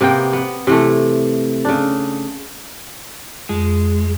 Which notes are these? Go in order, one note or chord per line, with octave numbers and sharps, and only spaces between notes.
C3 A#3 B3 G5
B3
C3 E3 A3
C#3 D4
F2 G#3